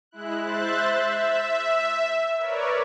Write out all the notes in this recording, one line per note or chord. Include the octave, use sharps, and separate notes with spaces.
G#3 E4 F#6
C5 E5 F#6 A6
E5
A#4 B4 C#5 D5